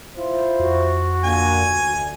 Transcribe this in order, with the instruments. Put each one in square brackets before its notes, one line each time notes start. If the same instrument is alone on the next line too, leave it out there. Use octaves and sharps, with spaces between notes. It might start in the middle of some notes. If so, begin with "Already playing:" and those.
[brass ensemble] E4 F4 C5
[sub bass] F2 [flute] F#4
[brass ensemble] A#2 D3 A#3 [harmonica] G#5
[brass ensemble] D2